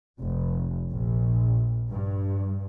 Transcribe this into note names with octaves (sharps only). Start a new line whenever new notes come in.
F1
A#1
G2